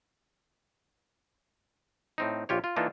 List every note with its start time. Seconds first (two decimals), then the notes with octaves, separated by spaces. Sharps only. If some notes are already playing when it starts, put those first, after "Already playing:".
2.18 A2 C4 D#4
2.49 A#1 F4 G4 C#5
2.64 F4
2.76 E3 A#3 D4 D#4 F4 A4